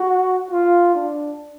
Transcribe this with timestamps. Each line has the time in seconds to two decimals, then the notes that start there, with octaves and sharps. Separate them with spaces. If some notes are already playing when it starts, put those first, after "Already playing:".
Already playing: F#4
0.51 F4
0.94 D4